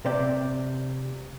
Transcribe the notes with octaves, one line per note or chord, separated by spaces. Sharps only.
C3 D5 G5